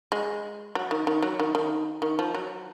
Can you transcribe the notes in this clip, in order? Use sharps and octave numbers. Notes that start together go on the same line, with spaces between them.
G#3
F#3
D#3
D#3
F#3
D#3
D#3
D#3
F3
F#3